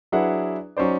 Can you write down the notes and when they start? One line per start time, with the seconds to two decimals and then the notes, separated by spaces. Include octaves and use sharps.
0.12 F#3 D4 E4 G#4 B4 F#5
0.77 F#3 C#4 D#4 C5 D5